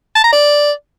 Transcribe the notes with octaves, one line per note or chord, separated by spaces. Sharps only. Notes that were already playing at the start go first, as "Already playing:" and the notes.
A5
A#5
D5